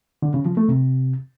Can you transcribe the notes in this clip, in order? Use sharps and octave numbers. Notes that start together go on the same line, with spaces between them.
D3
C#3
F3
A3
C3